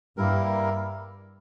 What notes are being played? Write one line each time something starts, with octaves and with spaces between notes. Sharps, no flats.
G2 G3 A#3 E4 A#4